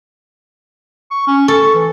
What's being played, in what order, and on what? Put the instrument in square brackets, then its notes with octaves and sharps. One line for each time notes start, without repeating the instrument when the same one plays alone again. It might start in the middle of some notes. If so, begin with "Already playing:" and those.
[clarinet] C#6
C#4
[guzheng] A4 [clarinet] C#6
[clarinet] E3